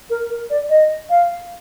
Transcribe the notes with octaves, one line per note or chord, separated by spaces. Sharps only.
A#4
A#4
D5
D#5
F5